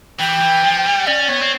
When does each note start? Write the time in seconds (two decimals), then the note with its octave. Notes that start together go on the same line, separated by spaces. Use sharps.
0.20 E3 G5
0.41 E3
0.64 F3
0.86 G3
1.07 C#4 D5
1.29 B3 C#5
1.42 C4